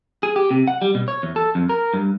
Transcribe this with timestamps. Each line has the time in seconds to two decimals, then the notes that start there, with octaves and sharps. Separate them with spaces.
0.23 G#4
0.36 G4
0.51 C3
0.68 F#5
0.82 G3
0.95 B2
1.08 C#5
1.23 E2
1.36 A4
1.55 F2
1.69 A#4
1.94 G2